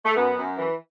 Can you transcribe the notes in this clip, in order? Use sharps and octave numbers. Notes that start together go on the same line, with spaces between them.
A3
F#2 B3
F#2
E3